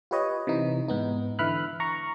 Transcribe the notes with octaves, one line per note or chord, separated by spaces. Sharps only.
F4 G4 B4 C#5 D#5
C3 E3 D#4
G#2 B3 D#4
D3 E3 E5 B5 F6 F#6
A#5 C#6